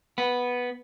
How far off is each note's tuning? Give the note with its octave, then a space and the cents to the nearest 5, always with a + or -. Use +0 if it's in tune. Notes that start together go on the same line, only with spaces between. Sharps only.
B3 -5